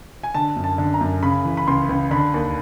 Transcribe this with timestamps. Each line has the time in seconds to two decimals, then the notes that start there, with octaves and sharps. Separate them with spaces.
0.24 G#5
0.34 D3 A5
0.56 F#2
0.64 A5
0.78 D3
0.94 A#5
1.01 F#2
1.23 C#3 B5
1.45 E3
1.57 B5
1.67 C#2 C6
1.89 C#2
2.11 D3 B5
2.34 D#2